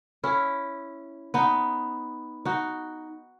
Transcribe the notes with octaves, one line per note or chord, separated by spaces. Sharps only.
C#4 E4
B3 D#4
D#4 F#4